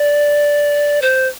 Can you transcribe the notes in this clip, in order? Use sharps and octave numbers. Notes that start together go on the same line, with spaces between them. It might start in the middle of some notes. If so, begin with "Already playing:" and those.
Already playing: D5
C5